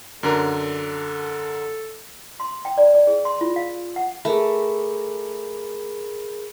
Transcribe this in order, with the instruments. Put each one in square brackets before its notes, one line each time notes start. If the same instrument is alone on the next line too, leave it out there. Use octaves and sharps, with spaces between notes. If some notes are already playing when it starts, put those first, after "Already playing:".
[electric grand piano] F#2 D3 A#4 [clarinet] A4
[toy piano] C6
G5
D5
D5
G#4
C6
F4
F5
F#5
[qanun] A3 [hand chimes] G#4 A#4 B5